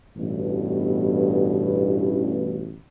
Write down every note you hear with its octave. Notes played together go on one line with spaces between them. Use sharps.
A1 G2 B2